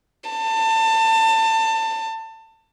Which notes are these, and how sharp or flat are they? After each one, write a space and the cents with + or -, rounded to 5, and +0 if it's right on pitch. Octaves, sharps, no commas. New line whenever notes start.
A5 +25